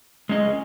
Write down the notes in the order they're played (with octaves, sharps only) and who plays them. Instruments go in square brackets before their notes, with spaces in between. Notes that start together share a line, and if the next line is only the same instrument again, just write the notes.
[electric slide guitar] G#3 C#4 G#4 D#5